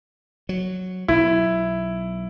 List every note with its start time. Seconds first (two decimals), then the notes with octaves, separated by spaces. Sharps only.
0.49 F#3
1.08 B1 E4